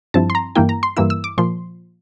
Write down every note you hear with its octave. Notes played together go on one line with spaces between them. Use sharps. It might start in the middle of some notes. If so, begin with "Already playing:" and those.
G2 F3 C4 E4 A5
C6
A#5
G2 E3 A#3 E4 G5
A#5
C6
G2 E3 A#3 E4 E6
E6
D6
A#2 F3 C6